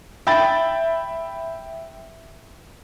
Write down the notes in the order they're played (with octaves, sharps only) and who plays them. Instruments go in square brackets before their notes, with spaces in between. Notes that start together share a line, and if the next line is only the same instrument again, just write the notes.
[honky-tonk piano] E5 G5 B5 A6